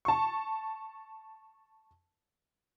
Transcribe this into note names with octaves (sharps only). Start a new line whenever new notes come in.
A5 C#6